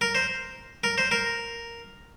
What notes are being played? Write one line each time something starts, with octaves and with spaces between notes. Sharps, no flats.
A#4
C5
A#4
C5
A#4